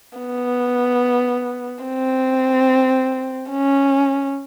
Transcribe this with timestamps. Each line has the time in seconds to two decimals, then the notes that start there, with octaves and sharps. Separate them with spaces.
0.19 B3
1.84 C4
3.50 C#4